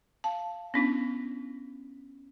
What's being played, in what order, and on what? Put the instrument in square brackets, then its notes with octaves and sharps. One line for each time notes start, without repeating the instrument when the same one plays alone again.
[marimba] F5 [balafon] A5
[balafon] B3 D4 E4 [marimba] C#4